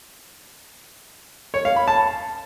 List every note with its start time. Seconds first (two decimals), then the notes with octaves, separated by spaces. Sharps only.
1.54 C#5
1.65 F5
1.76 B5
1.88 A5